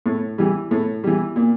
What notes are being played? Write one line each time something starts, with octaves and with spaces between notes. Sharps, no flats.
A2
E3 G3
A2
E3 G3
A#2